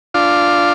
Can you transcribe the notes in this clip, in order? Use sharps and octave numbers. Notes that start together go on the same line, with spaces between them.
D4 F4